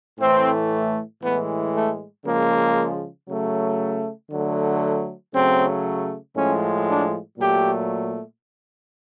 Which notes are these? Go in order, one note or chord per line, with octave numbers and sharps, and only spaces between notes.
A2 E3 A3 C4
A2 E3 G#3 B3
A3
C#3 F3 G#3 A#3
C#3 F#3 A3
D3 F#3 A3
C#3 F#3 A3 C4
A2 F3 G#3 C#4
D4
A#2 F#3 A3 G4